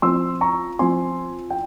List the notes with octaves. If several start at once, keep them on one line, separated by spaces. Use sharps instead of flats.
F3 C4 C6 E6
A#5 C#6
F3 C4 G#5 C6
G5